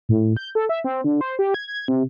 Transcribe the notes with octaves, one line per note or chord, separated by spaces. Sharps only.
A2
G6
A4
E5
C4
D3
C5
G4
G#6
G#6
C3